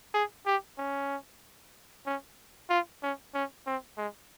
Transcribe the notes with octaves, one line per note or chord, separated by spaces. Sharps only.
G#4
G4
C#4
C#4
F4
C#4
C#4
C4
G#3